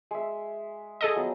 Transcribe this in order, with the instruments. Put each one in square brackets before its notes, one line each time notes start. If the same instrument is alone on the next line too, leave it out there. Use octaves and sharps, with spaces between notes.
[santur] G#3 E5
[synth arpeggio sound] G#4 A4 D#5
[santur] F3 F#3 B3